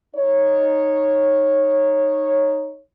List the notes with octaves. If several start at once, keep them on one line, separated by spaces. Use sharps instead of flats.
D#4 C#5